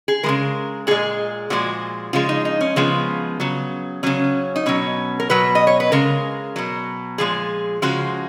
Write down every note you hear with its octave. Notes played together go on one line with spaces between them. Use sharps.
G#4
F3 G#3 A#4
C#3
A#2 G#3 G#4
A#2 F3 G#3 F#4
C#3 F3 G#3 F4
D#4
D#4
C#4
C#3 F3 G#3 B3
C#3 F#3
C#3 F#3 C#4
D#4
B2 F#3 C#4
A#4
B2 F#3 B4
D#5
C#5
B4
C#3 G#3 A#4
B2 F#3
A#2 F3 G#3 G#4
C#3 F3 G#3 F#4